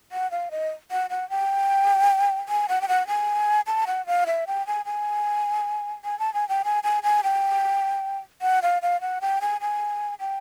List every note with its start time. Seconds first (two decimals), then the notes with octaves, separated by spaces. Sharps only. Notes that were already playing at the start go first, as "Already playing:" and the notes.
0.12 F#5
0.31 F5
0.51 D#5
0.91 F#5
1.10 F#5
1.30 G5
2.49 G#5
2.69 F#5
2.81 G5
2.88 F#5
3.07 G#5
3.67 A5
3.87 F#5
4.07 F5
4.27 E5
4.47 G5
4.67 G#5
4.86 G#5
6.04 G#5
6.19 A5
6.34 G#5
6.49 G5
6.65 G#5
6.84 G#5
7.03 G#5
7.24 G5
8.42 F#5
8.63 F5
8.82 F5
9.01 F#5
9.21 G5
9.41 G#5
9.61 G#5
10.20 G5